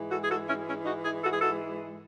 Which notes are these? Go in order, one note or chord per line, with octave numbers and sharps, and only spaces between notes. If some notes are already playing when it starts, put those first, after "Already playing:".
Already playing: G#2 E3 G#3
F#4 A4
G#4
F#4 A4
C#4 E4
C#4 E4
D#4 F#4
E4 G#4
F#4 A4
G#4
F#4 A4